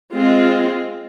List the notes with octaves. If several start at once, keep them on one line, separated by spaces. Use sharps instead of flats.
G#3 C4 F4